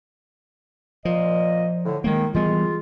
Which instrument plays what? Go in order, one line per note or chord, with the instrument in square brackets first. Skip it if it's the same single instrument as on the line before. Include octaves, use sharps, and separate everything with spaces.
[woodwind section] A#2 D#5 [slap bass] F3
[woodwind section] A2 D3
[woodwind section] D#3 [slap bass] G#3 A#3
[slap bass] E3 G3 B3 [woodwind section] G#3 F4